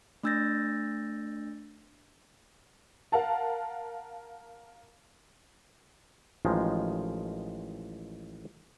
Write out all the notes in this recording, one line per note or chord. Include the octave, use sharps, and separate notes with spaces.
A3 D4 E6 G6 A6 A#6
A#4 F5 F#5 A5
A1 D#3 F3 G#3